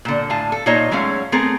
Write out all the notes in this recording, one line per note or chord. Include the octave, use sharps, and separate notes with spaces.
A#2 D3
A2 F5 G#5 A5
A4
A#2 D#4 F4 C#5 D#5
F#3 G#3 A3 C#4 C5 F5
A3 B3 C4 G#4 A#4